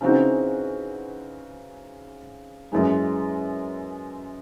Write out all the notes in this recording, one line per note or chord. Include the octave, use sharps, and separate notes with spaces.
C#3 E3 C4 D#4 F#4
F#2 E3 G#3